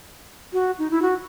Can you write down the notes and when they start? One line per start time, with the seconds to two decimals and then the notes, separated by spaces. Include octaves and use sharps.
0.53 F#4
0.79 D#4
0.91 E4
1.02 F#4